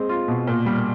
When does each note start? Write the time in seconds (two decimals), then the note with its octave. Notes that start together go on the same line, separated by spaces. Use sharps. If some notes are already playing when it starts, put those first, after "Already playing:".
Already playing: G#3 C4
0.09 F4
0.28 B2
0.47 A#2
0.66 G3